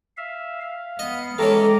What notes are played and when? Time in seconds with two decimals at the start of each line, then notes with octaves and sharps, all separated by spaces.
0.17 E5 F5
0.61 F5
0.99 B3 D#5
1.38 D#3 E3 G#3 C#4 A4 A#5 D6